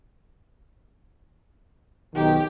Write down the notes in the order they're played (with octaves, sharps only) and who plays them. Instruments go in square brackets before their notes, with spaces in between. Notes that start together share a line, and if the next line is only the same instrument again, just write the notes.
[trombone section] B1 D#3 [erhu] G4